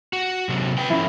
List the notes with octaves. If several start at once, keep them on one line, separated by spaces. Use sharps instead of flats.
F#4
C3 F#3
B4 G5
F3 C#4 E4